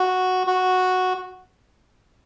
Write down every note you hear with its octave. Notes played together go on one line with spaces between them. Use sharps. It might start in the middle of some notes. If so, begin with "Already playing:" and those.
Already playing: F#4
F#4